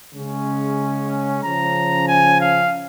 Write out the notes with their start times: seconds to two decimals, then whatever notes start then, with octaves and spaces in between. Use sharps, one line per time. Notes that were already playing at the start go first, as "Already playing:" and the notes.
0.14 C#3 G#3 C#4
1.43 C#3 F3 C#4 A#5
2.08 G#5
2.40 F5